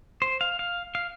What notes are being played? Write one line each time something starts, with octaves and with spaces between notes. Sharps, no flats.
C5
F5
F5
F5